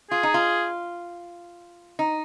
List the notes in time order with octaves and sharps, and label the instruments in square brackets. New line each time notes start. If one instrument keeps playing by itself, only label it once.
[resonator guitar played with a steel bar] F4 [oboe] G#4
[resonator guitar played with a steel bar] D#4
F4
D#4